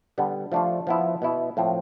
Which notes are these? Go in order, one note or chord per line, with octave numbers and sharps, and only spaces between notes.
D3 G3 B3
F3 A3 D4 F4
F3 B3 E4
B2 B3 E4
A2 F3 C4